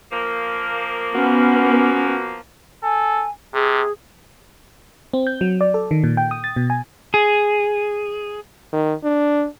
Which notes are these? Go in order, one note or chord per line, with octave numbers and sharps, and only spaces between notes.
F3 A#3
B3 C#4 F#4
A4 G#5
C3 G#4
C4
G6
F#3
D5
A4
D#3
A#2
G5
D#6
A6
B2
G#5
G#4
D#3
D4